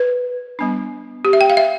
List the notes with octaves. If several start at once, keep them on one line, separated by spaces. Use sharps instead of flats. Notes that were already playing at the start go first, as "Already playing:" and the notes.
Already playing: B4
G3 B3 D4
G4
E5
G5
F5
E5